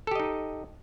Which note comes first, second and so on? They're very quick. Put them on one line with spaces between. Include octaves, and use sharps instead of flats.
A4 G4 D#5 D#4